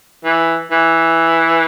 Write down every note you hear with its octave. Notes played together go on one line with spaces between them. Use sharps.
E3
E3